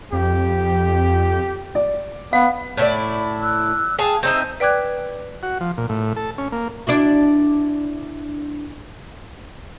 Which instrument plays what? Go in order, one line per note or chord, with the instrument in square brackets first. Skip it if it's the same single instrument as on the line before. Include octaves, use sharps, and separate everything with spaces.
[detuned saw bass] F2 [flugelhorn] G4
[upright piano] D5
[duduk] B3 [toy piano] F5
[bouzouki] A2 E4 D5
[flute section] D6 E6 F#6
[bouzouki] G#4 F5 A5 [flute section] G5 D#6
[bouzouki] C4 D#4 E5 [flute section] C5 A#5 E6
[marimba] B4 D5 G5 D6 F#6 G#6
[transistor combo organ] F#4
F3
A#2
A2
A4
C#4
A#3
[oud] D4 E4 F#4